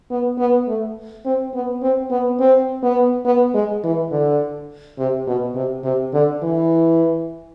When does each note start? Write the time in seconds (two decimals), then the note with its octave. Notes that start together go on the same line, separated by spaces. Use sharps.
0.10 B3
0.38 B3
0.67 A3
1.25 C4
1.54 B3
1.82 C4
2.11 B3
2.40 C4
2.83 B3
3.25 B3
3.54 G#3
3.83 E3
4.11 D3
4.98 C3
5.27 B2
5.55 C3
5.84 C3
6.13 D3
6.42 E3